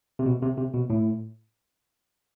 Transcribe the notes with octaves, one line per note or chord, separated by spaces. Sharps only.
C3
B2
C3
C3
B2
A2